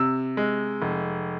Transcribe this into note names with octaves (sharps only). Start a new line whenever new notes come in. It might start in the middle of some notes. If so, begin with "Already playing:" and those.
Already playing: C3 E6
G#3
F1